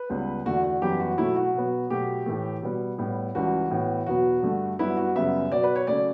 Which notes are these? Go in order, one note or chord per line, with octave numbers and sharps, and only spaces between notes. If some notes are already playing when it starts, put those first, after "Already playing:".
Already playing: B4
C#2 C#3 G3 B3
E2 D3 A3 F#4
F#4
F#2 E3 G3 B3 G4
F#4
B2 F#3 A3 E4
F#4
B2 F#3 B3
B2 F#3 A3 G4
A2 E3 A3
B2 G3 B3
A2 G3 B3
C#2 C#3 E3 G3 F#4
A2 E3 B3
E2 B2 F#3 B3 F#4
G2 D3 A3
G2 F#3 B3 E4
F#4
F#2 C#3 G3 B3 E5
B2 F#3 B3 D5
B4
C#5
C#3 F#3 A3 D5